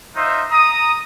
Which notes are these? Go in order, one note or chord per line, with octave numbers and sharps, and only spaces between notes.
D#4 F4 C5 D#5 E5
A#5 D#6